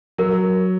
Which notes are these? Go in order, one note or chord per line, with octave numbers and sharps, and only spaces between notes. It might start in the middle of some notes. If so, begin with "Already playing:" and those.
F#3 A#4